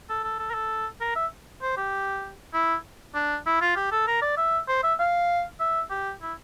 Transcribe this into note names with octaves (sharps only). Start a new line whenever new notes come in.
A4
A4
A4
A#4
A4
A#4
E5
C5
G4
E4
D4
E4
F4
G4
A4
A#4
D5
E5
C5
E5
F5
E5
G4
E4